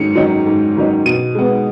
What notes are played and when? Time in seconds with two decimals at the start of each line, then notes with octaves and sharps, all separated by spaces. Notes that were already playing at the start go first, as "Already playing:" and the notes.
Already playing: G#2 D#3 F#3 C#4 C#7
0.15 D#3 F#3 C#4
0.46 G#2
0.76 D#3 F#3 C#4
1.06 B2 D#7
1.35 G#3 B3